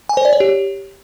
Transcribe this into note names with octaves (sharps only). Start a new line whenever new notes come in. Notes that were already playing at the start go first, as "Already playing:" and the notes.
G#5
C5
D5
C#5
G4